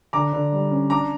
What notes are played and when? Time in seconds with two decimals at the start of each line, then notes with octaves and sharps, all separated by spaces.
0.13 D3 A#5 D6
0.33 D3
0.52 G3
0.71 C#4
0.90 D4 A#5 D6